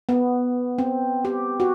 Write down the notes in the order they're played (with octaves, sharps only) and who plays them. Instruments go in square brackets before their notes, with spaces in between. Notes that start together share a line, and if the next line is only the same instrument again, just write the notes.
[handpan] B3
C4
G4
F#4